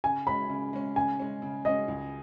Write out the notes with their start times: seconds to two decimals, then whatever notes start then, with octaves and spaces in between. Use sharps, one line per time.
0.04 C#3 G#5
0.27 G#3 C#4 B5
0.50 C#3
0.73 G#3 C#4
0.96 C#3 G#5
1.19 G#3 C#4
1.42 C#3
1.65 G#3 C#4 D#5
1.88 C#2